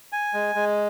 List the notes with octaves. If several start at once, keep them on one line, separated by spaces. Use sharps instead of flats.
G#5
G#3
G#3